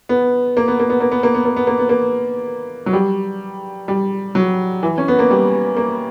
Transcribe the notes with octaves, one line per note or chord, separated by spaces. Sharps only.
B3
A#3
B3
A#3
B3
A#3
B3
A#3
B3
A#3
B3
A#3
B3
A#3
F#3
G3
G3
F#3
E3
C#4
B3
A#3
G3
A#3